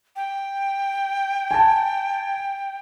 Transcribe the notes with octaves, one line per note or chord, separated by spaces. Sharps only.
G5
G#5 A5